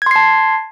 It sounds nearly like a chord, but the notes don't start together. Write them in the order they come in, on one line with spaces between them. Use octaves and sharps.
G#6 C6 C7 A5